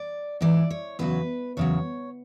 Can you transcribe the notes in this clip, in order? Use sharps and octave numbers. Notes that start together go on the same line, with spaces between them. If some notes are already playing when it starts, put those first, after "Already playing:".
Already playing: D5
G#2 E3 D5
C#5
E2 C#3 F#3 B4
E2 C#3 F#3 C#5